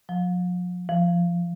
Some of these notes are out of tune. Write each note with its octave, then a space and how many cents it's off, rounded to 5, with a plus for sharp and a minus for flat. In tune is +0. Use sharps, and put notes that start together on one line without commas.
F3 +40
F3 -15